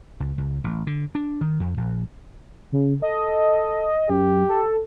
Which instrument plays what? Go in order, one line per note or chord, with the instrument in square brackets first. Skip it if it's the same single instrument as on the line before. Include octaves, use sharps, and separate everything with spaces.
[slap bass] C#2
C#2
A1
D3
D4
D#3
F2
A#1
[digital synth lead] C#3
[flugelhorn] A4 [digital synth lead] D#5
[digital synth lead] F#2 [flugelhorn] G4
[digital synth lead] A4